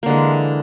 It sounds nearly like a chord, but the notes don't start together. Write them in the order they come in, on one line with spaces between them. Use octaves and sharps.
A#3 D3 G#3 E3